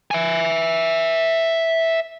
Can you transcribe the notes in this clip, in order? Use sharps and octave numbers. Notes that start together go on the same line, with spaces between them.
E5 G#5